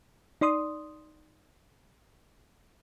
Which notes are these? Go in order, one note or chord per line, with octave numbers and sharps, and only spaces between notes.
D#4 D5 C6 D#6